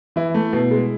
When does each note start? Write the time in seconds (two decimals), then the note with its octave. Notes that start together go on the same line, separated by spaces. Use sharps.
0.16 E3 E4
0.34 A3
0.53 B2
0.71 G#3